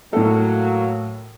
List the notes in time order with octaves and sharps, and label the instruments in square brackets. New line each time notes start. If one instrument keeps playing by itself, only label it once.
[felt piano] A2 A4 [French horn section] F#3 A#3